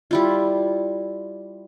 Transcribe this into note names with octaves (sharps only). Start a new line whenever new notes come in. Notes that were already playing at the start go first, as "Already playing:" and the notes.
G3 E4 F4